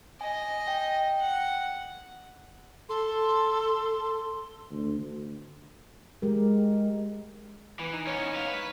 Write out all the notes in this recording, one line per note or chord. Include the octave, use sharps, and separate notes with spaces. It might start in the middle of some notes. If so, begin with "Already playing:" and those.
D#5 G#5
G5
F#5
A4 C6
D2
G#3 G4 A#4
E3 B3
D#4
B3 C#4 C#5
B4 F5
B4